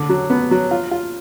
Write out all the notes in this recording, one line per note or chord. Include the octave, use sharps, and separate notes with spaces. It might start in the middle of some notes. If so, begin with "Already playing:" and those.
Already playing: D3
F#3
B3
F#3
F4
F4